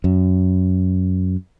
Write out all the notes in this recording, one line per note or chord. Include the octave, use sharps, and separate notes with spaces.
F#2